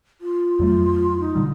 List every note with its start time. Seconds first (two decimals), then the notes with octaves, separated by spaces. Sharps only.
0.21 F4
0.59 F2 F#3 A3
1.20 D#4
1.35 A#2 D3 G3